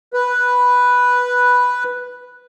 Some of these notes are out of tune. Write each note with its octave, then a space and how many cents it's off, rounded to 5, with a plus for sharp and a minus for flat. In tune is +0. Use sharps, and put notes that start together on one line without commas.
B4 -5